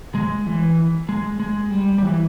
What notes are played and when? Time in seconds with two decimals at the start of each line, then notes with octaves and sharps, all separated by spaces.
0.15 G#3
0.47 E3
1.09 G#3
1.40 G#3
1.71 G3
1.98 G3
2.03 E3